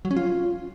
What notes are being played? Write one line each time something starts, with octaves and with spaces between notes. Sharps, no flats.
F#3
C#4
F4